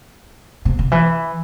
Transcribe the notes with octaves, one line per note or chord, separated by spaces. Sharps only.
C3
D3
E3